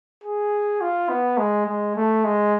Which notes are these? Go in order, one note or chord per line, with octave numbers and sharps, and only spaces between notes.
G#4
F4
B3
G#3
G#3
A3
G#3